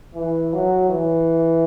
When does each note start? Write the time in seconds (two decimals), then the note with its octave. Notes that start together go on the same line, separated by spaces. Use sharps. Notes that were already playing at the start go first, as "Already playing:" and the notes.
0.15 E3
0.53 F#3
0.89 E3